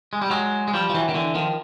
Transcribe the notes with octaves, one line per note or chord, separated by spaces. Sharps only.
G#3
G3
F#3 G#3
G#3
F3 G3
F3
E3 F#3
D#3
D3 E3
D#3 F3